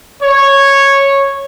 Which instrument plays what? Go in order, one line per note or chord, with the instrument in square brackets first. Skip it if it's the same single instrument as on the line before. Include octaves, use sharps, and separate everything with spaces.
[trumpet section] C#5